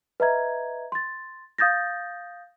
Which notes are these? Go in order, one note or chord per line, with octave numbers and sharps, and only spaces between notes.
B4 D#5 E5 A#5 G#6
C6 A6
F5 D#6 G6 A6 A#6